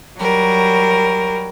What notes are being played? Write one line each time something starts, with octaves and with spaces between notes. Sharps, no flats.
F#3 G3 A#4